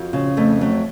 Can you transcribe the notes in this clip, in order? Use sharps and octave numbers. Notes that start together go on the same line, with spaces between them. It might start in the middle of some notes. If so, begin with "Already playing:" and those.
Already playing: F2 F#4
C#3
F2 A3
F#3 A3